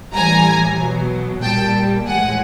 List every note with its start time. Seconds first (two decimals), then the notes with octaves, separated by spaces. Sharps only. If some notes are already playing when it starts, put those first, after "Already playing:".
0.14 A2 E3 G3 G#5 A#5
0.79 B2 F#3
1.42 A#2 G3 G5 A5
2.06 A2 E3 G#3 F#5 G#5